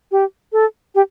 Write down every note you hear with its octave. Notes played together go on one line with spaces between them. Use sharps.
G4
A4
G4